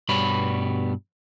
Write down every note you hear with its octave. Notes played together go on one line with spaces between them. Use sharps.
G2 B2 G3 B3 C#5 B5